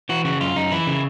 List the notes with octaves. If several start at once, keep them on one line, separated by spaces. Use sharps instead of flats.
E3 F#4
C#3 F#4
F#2 F4
F#2 D#4
E3 E4
C#3